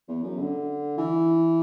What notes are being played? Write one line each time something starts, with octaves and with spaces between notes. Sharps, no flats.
E2
F#2
D3
E3